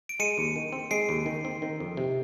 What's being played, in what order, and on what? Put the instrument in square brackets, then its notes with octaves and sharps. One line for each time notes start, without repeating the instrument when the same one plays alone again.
[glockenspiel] D7
[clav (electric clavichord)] G#3 [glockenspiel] C#7 D#7
[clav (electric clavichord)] D#2
D#3
C4
[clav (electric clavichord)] G#3 [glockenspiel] C7 D7
[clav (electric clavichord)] D#2
D#3
C4
D#3
F2
C3